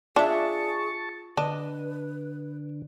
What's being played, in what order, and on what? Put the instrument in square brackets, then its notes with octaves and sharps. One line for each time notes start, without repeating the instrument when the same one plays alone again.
[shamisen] D4 [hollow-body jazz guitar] F4 E5 [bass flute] G#4 [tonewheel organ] A5 C#6
[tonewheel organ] D3 [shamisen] D4 [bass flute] B4 [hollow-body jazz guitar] D#5